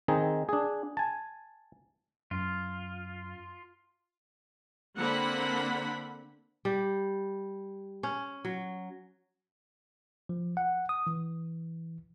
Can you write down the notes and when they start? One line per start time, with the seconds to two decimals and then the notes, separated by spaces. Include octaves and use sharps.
0.08 D#3 C4 D#4 G#4
0.49 D4 G#4
0.97 G#5 A5
2.31 F#2 F4
4.96 D3 A#3 C4 D4 F#5 B5
6.65 G3
8.03 C#4
8.45 F#3
10.29 F3
10.57 F#5
10.89 D#6
11.07 E3